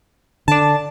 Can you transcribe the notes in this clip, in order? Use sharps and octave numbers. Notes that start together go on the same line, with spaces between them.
D3 D4 A5